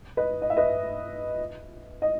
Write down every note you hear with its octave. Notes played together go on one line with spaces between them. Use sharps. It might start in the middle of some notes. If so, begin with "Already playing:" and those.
B4 D#5
D#5
E5
B4 D#5
D#5